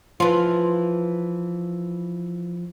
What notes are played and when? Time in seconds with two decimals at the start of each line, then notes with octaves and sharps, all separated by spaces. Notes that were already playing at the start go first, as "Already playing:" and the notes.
0.20 E3 F3 F4